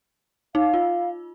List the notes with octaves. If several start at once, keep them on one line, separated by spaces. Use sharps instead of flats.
D#4 F5
F4